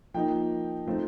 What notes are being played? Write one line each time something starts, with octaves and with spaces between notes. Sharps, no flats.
F3 A#3 D#4 G5
F3 A3 C4 D#4